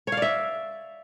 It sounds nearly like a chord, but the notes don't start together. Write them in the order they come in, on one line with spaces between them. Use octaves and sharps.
C#5 F5 D5 E5